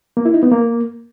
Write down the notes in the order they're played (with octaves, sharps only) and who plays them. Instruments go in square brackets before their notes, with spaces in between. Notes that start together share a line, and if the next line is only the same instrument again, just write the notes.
[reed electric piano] A#3
E4
D#4
B3
A#3